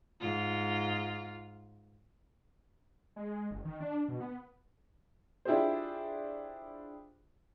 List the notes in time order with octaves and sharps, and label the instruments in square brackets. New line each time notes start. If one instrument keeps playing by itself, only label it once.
[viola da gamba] G#2 F4
[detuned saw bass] G#3
F#1
D#3
D4
B2
B3
[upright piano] D4 E4 F4 G4 G#4 C5